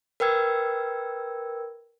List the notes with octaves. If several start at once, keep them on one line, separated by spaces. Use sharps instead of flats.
A#4 B4 G5 E6 G#6